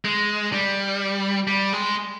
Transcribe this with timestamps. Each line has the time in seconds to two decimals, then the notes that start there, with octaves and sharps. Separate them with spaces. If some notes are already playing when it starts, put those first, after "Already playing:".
0.05 G#3
0.53 G3
1.48 G3
1.73 G#3